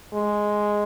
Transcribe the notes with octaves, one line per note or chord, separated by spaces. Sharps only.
G#3